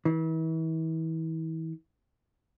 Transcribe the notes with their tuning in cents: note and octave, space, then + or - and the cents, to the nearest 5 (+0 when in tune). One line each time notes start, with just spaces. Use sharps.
E3 -35